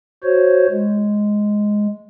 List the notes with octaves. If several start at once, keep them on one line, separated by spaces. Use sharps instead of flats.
F#4 C5 C#5
G#3